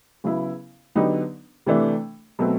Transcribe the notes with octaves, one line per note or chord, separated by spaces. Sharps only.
C#3 F#3 B3 E4
D3 F#3 B3 D#4 G4
C3 E3 A3 D4
B2 F#3 A3 C4